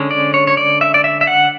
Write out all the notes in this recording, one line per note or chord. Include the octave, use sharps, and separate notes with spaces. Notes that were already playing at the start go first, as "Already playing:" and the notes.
Already playing: D3 G#3 C#4
D5
C#5
C#5
D5
E5
D5
E5
E5
F#5